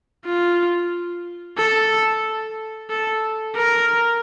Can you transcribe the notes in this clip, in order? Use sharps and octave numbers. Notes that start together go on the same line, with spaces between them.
F4
A4
A4
A#4